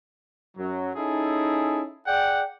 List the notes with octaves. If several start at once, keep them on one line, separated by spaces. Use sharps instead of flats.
F#2 F#3
C#4 D#4 E4 G#4 A4
G#4 D5 F#5 G5